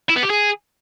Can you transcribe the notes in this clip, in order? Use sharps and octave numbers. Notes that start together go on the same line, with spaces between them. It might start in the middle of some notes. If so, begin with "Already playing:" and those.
E4
B3
G4
G#4